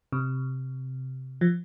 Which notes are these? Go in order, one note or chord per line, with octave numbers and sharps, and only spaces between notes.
C3
F3